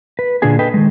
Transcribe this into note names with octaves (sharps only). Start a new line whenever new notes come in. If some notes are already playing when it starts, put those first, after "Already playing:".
B4
A#2 D3 D4 F4 G#4 G#5
A4 B4 D#5 G5
D#3 G#3